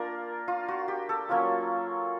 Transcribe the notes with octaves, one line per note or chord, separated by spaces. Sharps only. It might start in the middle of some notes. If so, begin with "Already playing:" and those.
Already playing: A#3 D4 F4 A#4 D5
F4
F#4
G4
A4
F#3 A#3 C#4 F4